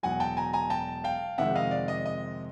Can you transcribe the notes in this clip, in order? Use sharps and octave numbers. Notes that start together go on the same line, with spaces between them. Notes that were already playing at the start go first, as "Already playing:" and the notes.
E1 E2 B2 F#3 F#5 G#5
G5 A5
G#5 A#5
G#5 A#5
G5 A5
F5 G5
F2 C3 D#3 G#3 E5 F#5
D#5 F5
D5
D#5
D#5